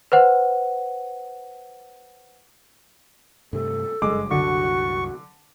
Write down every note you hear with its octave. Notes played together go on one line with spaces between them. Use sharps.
B4 C5 F#5
G2 C3 A3 A4
F#1 G2 F#3 G#3 D6
C2 F#2 D3 F#4 C#6